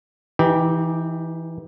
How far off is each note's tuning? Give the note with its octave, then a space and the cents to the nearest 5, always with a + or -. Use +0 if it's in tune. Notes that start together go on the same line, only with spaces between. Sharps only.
E3 +0 D#4 +30 G4 +0